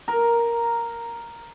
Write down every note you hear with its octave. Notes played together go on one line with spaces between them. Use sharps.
A#4